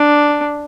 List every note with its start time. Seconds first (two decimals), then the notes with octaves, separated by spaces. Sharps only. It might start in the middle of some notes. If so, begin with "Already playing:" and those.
Already playing: D4